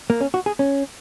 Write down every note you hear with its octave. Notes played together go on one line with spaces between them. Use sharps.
A#3
C#4
F#4
G#4
C#4